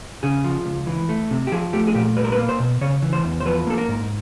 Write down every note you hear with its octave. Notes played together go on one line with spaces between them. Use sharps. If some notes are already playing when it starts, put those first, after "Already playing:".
C#3 G#4
F3
C#2
E3
A3
C3
G4
F3 G#4
A3 G4
G#4
A#2 G4
G3 B4
A#4
B4
A#3
C5
B2
C#3 C#5
E3
C5
E2
C5
F3 B4
A#3 A4
A#4
G#2